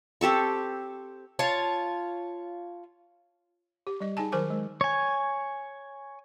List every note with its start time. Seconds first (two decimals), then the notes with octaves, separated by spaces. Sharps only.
0.21 C4 G4 A4 C#6
1.39 F4 C#5 A5
3.87 G4
4.01 G3 D#5
4.17 D#4 G#4 G#5 A5
4.32 D#3 F#3 A#4 C5 G#5 D6
4.50 G#3
4.81 C#5 G#5